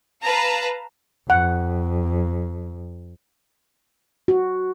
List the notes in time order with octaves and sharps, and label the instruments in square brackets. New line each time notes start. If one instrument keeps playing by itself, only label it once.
[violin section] B4 F5 A5 A#5
[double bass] F2 [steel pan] F#5
[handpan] F#4